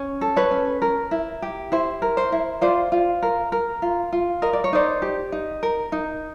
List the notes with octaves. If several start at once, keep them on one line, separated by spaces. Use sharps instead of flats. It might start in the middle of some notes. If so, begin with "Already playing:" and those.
Already playing: C#4
A4
B4 C#5
C#4
A#4
E4
G4
E4 C5
A#4
C5
E4
F4 C5 D5
F4
A#4
A#4
F4
F4
A#4 D#5
D5
C#5
D#4 C5 D5
G4
D#4
A#4
D#4